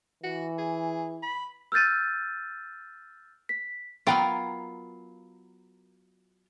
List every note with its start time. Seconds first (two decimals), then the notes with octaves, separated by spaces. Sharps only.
0.23 E3 F#4
0.58 G#4
1.23 B5
1.72 E6 F6 G6 A6 D#7
3.49 B6
4.07 F#3 B3 F4 A#4 F5 G5